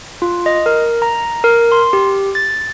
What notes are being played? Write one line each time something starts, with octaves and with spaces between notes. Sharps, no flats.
F4
D#5
A#4
A#5
A#4
C6
G4
A6